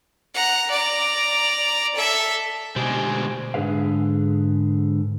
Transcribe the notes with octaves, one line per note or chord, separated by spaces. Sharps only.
F#5 A#5
D5 A#5
A4 E5
D2 B2 G#3 G4 C5 G#5
G#2 D3 G#4 B4 F5